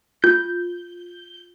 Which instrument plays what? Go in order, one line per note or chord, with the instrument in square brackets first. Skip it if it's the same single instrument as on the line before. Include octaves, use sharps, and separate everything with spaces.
[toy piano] F4 [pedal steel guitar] G6